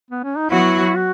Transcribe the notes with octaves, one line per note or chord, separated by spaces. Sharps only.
B3
C#4
D#4
F#3 B3 E4 F#4
F#4